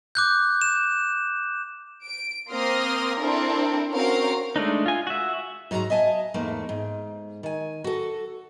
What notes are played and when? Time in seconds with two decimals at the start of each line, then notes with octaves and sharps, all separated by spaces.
0.15 D6 F#6 G6
0.61 E7
2.05 D7
2.53 A#3 C4 C6 D#6 F6 A#6
3.20 C4 D4 E4 A4 A#4
3.93 C4 C#4 F#4 A#4 F5 A#5
4.56 G#3 A3 D4 D#4
4.86 F4 G#5
5.07 F#4 E5
5.71 G#2 F#3 F#4 A4 A#5
5.90 D#5 E5 G#5 A5
6.34 E2 G#2 A3 A#3
6.69 G#2
7.43 D#3 G#5
7.84 F#4 A4